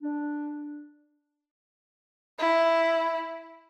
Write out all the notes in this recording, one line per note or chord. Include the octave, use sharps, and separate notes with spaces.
D4
E4